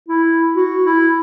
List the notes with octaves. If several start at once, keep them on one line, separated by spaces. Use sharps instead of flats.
E4
F#4
E4